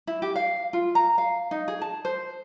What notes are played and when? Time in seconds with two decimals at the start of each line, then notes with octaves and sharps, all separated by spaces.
0.07 E4
0.22 G4
0.36 F5
0.73 F4
0.95 A#5
1.18 F5
1.51 D#4
1.68 G#4
1.82 A5
2.05 C5